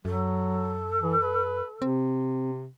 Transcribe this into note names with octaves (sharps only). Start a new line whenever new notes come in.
F#2 F#3 A4
E3
B4
C3 C4